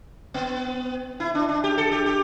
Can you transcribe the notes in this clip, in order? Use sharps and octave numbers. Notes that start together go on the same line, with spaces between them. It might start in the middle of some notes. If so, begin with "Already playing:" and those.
B3
E4
D4
D4
G4
A4
G4
G4